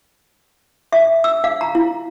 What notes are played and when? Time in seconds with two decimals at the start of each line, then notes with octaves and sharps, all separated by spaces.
0.92 E5
1.24 E6
1.44 F5
1.61 A#5
1.75 E4